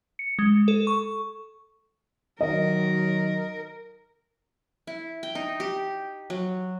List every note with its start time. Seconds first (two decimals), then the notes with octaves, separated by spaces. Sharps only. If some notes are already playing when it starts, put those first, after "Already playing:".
0.19 C#7
0.39 G#3
0.68 A4
0.87 C#6
2.41 D#3 F#3 A#4 D#5
4.87 E4
5.23 G5
5.35 D#4
5.60 G4
6.30 F#3